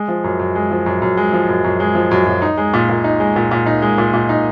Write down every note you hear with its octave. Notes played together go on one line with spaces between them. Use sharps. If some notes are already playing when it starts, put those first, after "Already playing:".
Already playing: G#3
F3
F#2
F#2
G#3
F3
F#2
F#2
G#3
F3
F#2
F#2
G#3
F3
F#2
F#2
D#4
G#3
A#2
A#2
D#4
G#3
A#2
A#2
D#4
G#3
A#2
A#2
D#4